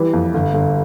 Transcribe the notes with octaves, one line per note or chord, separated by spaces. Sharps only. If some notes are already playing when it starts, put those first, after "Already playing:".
Already playing: E3 G3
F2
G1
G1